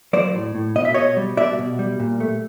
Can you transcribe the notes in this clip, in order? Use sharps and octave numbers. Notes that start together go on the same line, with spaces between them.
F#3 C5 D5
A2
A2
B2 D#5
E5
B2 C#5 D#5
G3
B2 D5 E5
B2
G3
A#2
A3